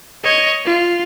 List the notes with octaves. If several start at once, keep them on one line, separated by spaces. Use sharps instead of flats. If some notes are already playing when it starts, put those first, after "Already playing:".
C#5 D#5
F4